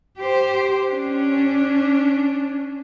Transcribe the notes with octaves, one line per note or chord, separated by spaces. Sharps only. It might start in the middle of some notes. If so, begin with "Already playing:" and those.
G4 C5
C#4 D4